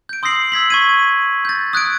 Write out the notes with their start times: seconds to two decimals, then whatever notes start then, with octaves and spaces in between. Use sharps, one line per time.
0.09 G6 D7
0.23 C6 D#6 E6 A#6 C7 F#7
0.52 E6 G#6 B6 F#7
0.70 C#6 G#6 D#7
1.45 G6 A6
1.73 D#6 F#6 G#6 D7